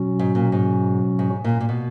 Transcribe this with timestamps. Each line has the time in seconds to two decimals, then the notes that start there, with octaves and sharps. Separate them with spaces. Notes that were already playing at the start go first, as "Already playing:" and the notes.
Already playing: B2 F#3 C#4 F#4
0.19 G#2
0.35 A#2
0.52 G#2
1.19 G#2
1.44 A#2
1.61 A#2
1.69 B2